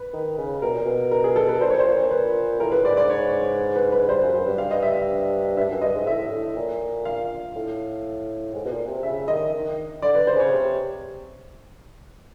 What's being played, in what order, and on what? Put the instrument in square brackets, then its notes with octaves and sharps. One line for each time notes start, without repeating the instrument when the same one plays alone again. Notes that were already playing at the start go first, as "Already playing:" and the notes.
Already playing: [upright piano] B4
[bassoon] D#3
C#3
[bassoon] B2 [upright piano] A#4
[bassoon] A#2
B2
[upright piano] A#4
G#4
A4
B4
[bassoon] A#2 [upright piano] C5
[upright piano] C#5
C5
[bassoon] A#2
[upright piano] B4
[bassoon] A2 [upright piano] A#4
[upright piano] B4
[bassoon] G#2 [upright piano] D5
[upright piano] D5
C#5
B4
B4
[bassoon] G2 [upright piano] C5
[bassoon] F#2
F#2
G2
[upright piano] F5
D#5
E5
[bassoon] G2 [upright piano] E5
[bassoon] F#2
[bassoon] G2 [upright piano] D#5
[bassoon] G#2
[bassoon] A2 [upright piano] E5
[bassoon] A2
A#2
[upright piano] F5
[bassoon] A2
G#2
B2
A#2
C3
[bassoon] C#3 [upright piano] E5
[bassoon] D#3 [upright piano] D#5
[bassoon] D#3
[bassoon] D3 [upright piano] D5
[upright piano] B4
C5
[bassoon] C#3 [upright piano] C#5
[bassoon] C3